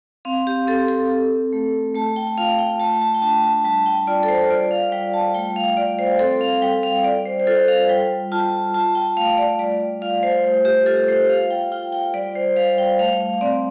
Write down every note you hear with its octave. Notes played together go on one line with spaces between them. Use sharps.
C4 F5
G4
C4 A4
A4
C4
A3
A3 A5
G5
F4 F5
G5
A3 A5
A5
G5
D4 A5
A5
G3 A5
G5
F4 D5
A4
C5
F4 D5
F5
G3 G5
A5
A3 G5
F5
F4 D5
C5
C4 A4
F5
G3 G5
F5
F4 D5
C5
C5
F4 A4
F5
G3 G5
F4 A5
F4 A5
G5
A3 F5
D5
G3 D5
F4 F5
C5
A3 C5
G4
F4 A4
C5
F4 F5
G5
F4 G5
G5
G3 D5
C5
G3 F5
G5
A3 F5
F5
C4 D5